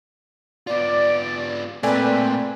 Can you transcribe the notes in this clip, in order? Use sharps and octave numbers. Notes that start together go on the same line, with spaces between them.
B3 F4 D5
A#2 A3 C4 B4 D5 G#5